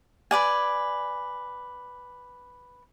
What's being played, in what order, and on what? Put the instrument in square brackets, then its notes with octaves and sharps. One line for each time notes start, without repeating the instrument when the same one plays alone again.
[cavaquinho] B4 D5 G#5